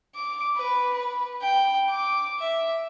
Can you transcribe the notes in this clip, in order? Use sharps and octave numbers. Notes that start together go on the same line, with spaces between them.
D6
B4
B4
G5
D6
E5